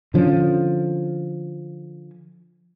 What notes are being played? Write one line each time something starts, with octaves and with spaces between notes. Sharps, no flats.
D3 F3 C#4